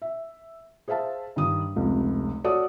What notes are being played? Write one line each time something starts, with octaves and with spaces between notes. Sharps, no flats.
E5
G#4 C5 E5 F5 A5
G2 D#3 D#6
F1 C#2 C3
F#4 A4 C#5 D5 D#6